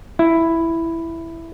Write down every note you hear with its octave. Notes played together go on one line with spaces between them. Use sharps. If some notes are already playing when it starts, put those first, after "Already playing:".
E4